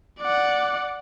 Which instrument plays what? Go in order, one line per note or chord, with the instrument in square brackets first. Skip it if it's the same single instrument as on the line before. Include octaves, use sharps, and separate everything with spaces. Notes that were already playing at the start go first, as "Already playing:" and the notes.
[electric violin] D5 F#5